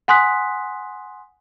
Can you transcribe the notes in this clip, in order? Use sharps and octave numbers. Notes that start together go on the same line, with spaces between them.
F#5 G#5 C6 D#6 F#6 B6